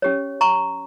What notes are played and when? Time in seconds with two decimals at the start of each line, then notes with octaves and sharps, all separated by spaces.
0.02 C#4 G4 C#5
0.41 A#5 C#6